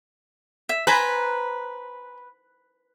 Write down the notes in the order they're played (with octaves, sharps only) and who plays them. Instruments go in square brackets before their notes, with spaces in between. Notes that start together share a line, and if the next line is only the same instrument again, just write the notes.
[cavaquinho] E5
[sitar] B4 [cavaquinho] C5 G#5 A#5